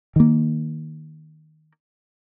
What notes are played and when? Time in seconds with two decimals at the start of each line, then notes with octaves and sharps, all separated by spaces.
0.16 D#3 A#3